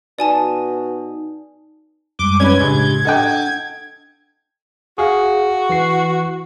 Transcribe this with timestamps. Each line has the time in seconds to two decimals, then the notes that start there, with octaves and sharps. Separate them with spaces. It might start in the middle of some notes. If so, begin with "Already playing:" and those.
0.19 B2 D#4 D5 G#5 A5
2.19 F#2 G3 G#3 D6
2.40 C#4 B4 G#6
2.60 C#2 A2 D4 G4
3.05 D4 A4 D#5 F#5 G5
4.98 F#4 G#4 F5
5.70 E3 C7